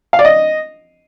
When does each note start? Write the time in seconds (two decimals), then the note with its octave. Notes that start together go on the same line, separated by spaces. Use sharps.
0.13 F5
0.19 D5
0.25 D#5